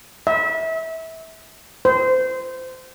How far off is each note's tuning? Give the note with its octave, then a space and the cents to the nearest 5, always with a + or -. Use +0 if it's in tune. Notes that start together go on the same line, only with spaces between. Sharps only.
E5 -25
C5 -25